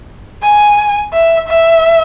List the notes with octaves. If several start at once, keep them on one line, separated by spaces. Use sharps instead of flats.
G#5
E5
E5